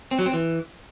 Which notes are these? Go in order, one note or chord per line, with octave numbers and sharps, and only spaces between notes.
C4
F#3
C4
E3